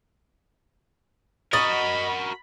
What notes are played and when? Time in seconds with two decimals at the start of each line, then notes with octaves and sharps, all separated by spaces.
1.53 F#4 A#4 D#5 B5 C#6 A6 F#7